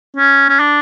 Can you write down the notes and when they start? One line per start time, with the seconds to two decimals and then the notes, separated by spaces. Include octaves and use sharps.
0.17 C#4
0.49 C#4
0.60 D4